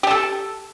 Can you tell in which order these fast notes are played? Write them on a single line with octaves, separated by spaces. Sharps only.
G4 A5 A4